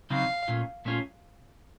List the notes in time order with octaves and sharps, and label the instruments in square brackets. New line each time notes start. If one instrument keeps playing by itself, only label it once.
[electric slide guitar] C#3 F#3 C4 D#4 [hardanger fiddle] F5
[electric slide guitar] A#2 A3 C#4 F4
A#2 A3 C#4 F4